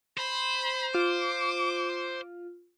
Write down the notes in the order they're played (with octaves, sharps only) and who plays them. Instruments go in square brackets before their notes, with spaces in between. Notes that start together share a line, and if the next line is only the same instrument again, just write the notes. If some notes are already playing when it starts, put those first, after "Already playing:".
[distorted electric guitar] C5 [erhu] B5
[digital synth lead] F4 [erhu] D6